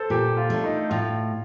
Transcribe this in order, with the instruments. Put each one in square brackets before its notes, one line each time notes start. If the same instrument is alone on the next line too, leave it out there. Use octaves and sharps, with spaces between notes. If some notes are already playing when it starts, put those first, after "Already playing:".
Already playing: [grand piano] A4 C5
[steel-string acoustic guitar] A#2 [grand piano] G4
[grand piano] F4
[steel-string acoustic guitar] A3 D4
[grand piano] D#4
[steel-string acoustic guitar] A2 [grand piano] F4